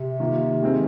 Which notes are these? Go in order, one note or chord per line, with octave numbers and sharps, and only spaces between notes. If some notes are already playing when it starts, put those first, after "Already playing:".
Already playing: C3
D#3 A#3 F4
D#3 G#3 C4